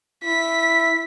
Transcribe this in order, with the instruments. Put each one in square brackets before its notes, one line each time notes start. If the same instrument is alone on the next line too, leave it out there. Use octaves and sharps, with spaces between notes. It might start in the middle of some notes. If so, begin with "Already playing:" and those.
[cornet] E4 [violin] B6